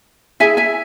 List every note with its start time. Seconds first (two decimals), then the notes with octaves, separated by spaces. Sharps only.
0.40 E4 G#4 E5 G#5
0.57 E5 G#5